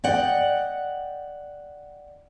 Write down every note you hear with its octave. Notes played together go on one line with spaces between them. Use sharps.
D5 D#5 F#5 G5